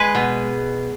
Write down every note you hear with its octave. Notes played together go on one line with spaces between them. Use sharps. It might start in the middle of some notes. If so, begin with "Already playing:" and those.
Already playing: G#3 G#4 B4
B2